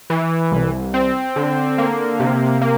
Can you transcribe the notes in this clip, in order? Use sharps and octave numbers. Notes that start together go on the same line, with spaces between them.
E3
C2
C4
D3
A#3
C3
A#3